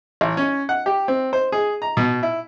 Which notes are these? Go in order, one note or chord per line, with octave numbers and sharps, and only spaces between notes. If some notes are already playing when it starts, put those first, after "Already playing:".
A1
C#4
F#5
G4
C4
C5
G#4
A#5
B2
E4